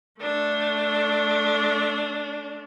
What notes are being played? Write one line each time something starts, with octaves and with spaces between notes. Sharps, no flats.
A3 D4